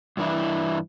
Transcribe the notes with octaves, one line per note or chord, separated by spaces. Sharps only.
G2 E3 D4 E4